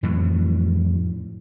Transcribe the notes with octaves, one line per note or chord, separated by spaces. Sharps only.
F2 A2 E3 F#3